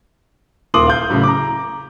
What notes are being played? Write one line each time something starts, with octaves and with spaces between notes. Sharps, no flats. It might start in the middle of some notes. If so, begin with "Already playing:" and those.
D#1 A#3 C6 D6 D#6 F#7
F5 G6
A2 C#3 F#3
A#5 D6